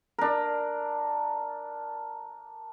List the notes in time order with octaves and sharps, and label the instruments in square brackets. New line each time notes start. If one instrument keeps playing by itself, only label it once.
[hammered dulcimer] D4 A#4